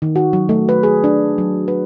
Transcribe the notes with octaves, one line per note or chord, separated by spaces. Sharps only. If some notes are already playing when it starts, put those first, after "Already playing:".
D#3
F#4
F#3
A3
B4
G#4
D4
F#3
B4